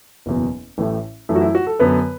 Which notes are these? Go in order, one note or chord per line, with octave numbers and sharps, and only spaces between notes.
F#1 E2 B2
A1 A2 A3
F#2 E3 A3
F#4
E4
F#4
A4
F#2 D3 B3 B4